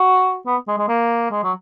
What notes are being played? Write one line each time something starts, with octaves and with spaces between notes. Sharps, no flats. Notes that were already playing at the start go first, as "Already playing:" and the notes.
Already playing: F#4
B3
G#3
G#3
A#3
G#3
F#3